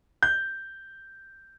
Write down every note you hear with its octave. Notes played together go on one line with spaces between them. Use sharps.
G6